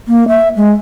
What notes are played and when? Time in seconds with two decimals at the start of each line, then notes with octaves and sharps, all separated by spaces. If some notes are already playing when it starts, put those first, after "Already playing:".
0.08 A#3
0.28 E5
0.57 G#3